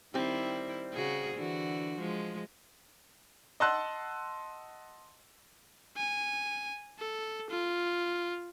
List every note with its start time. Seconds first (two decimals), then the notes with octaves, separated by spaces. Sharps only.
0.14 D#3 G3 C4 E4
0.93 C#3 F#4 G#4
1.35 D3 E3 F#4
1.98 F3 G#3
3.60 D#5 F#5 A5 C6 E6 F#6
5.97 G#5
6.99 A4
7.50 F4